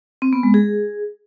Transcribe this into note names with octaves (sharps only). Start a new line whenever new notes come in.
C4
B3
G#3
G#4